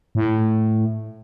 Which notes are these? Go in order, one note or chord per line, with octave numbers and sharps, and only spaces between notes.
A2